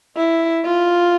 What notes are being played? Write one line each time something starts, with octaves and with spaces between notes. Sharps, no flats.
E4
F4